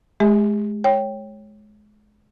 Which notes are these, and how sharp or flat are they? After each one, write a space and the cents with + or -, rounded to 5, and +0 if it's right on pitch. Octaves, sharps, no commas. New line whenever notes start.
G#3 +25 G4 +45 E5 -30
C#5 -10 G5 +0